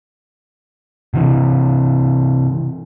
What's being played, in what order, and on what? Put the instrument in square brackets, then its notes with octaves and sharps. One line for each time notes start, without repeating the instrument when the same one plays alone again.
[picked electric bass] C3 E3